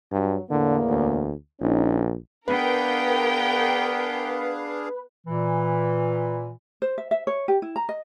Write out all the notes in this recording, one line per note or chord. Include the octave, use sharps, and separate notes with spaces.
G2 F#3
E2 A2 D3 A#3
D2
A#1 C#4 D#4
B3 D4 G#4 A#4 B4 F5 G5
A#2 E3
C5
E5
E5
C#5
G4
E4
A#5
D#5